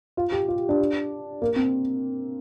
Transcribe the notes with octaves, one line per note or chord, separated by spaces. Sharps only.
F4
G4
F4
D4
A#3
C4